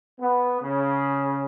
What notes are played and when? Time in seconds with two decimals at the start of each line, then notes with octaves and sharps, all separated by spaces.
0.20 B3
0.61 C#3